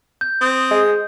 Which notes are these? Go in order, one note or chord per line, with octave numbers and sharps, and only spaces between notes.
G6
C4 D#6
G#3